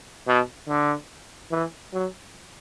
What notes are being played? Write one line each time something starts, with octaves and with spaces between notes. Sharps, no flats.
B2
D3
E3
F#3